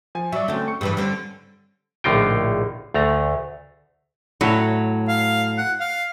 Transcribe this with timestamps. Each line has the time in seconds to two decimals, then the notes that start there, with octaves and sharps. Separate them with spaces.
0.15 F3 G#5
0.32 F#3 D5 E5
0.48 D3 A3 C4 C#4
0.68 C#6 C#7
0.81 G2 E3 G3 B4
0.97 D3 C4 C#4
2.04 A#1 A2 D3 D#4 F4 G5
2.94 D2 A3 A#5
4.41 A2 F#3
5.08 F5
5.58 F#5
5.80 F5